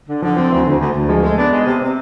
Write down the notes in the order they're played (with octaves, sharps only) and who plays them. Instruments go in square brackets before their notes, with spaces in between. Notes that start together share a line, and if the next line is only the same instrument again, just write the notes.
[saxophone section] D3
[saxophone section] D3 [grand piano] F3
[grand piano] F3 [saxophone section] C4
[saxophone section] D2 [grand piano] E3
[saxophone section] D2
D2
D2
[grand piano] F3 [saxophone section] G#3
[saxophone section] G#3 [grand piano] A3
[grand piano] B3 [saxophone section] D4
[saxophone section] G#3
C3
C3